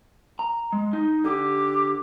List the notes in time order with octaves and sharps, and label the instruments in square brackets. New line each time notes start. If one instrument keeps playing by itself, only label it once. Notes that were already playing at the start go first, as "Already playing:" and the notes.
[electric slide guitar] A#5
G#3
D#4
[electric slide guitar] D3 [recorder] G4